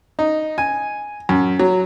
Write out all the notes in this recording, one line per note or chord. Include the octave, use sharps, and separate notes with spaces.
D#4
G#5
F#2
F#3